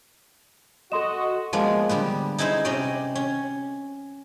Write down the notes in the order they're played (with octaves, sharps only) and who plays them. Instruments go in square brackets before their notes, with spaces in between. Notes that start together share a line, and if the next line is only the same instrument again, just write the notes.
[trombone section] F#4 [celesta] A4 C6 E7 [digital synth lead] D#5
[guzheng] F3 G#3 A#3 B3
D3 G3 B3 B4
D#4 E4 G#4 B4 C5
C3 C#4 D5 D#5 G5
C#4